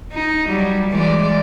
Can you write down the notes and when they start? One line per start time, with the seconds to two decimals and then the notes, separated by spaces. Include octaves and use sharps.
0.12 D#4
0.48 F#3 G3
0.90 E3 G#3 D5